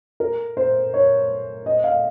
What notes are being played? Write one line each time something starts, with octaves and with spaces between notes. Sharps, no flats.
A#4
C5
C#5
D#5
F5